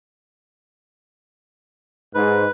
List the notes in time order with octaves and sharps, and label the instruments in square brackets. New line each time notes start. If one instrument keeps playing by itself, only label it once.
[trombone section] G#2 [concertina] B4